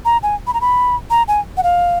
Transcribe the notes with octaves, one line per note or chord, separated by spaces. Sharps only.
A#5
G#5
B5
A#5
B5
A#5
G#5
F#5
F5